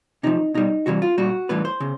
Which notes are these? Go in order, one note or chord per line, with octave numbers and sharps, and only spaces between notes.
C3 F3 D#4
B2 G3 D#4
C3 E3 G3 F#4
F4
A#2 G3 F#4
A2 E3 G3 B4
C5
C#3